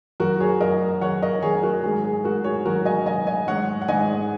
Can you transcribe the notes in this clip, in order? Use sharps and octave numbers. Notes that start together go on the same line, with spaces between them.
F#2 F#4 A#4
G#4 C#5
F#2 A#4 D#5
F#3 C#5 F#5
A#4 D#5
F#3 G#4 C#5
F#4 A#4
G#2 G#4
G#4
G#2 F#4 A#4
G#4 C#5
F#3 F#4 A#4
D#5 G#5
F#3 D#5 G#5
D#5 G#5
G#2 C#5 F#5
F#5
G#2 D#5 G#5